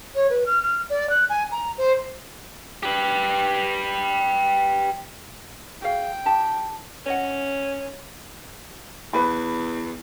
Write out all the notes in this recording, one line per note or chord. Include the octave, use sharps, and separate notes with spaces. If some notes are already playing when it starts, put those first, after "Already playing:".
C#5
B4
F6
F6
D5
F#6
G#5
A#5
C5
G4 B4
F#4 G#4 F5 G5
D#4 G4 A5
C#4 C#5 D#5 F#5
E2 B4 B5